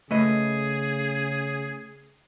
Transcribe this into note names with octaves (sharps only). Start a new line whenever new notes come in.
C#3 A3 G#4 B4 D#5